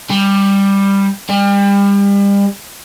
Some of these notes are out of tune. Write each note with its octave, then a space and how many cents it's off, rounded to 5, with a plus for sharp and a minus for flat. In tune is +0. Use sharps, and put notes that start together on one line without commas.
G3 +10
G3 +35